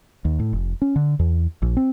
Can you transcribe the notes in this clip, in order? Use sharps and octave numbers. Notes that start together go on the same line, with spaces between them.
D#2
A2
F1
C#4
D3
E2
A#1
C4